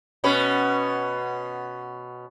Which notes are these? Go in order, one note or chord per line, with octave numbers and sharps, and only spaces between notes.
B2 C#4 B4